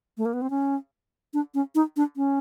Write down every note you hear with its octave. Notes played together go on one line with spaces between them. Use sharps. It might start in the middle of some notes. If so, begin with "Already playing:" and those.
A3
A#3
B3
C4
C#4
D4
C#4
D#4
D4
C#4